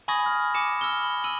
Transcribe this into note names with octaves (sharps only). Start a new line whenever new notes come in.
G#5 B5 C#6 D#6 G#6 A#6
F6
G#5 D6 C#7 E7
E6 F6 G7
B5
E6 D#7 F#7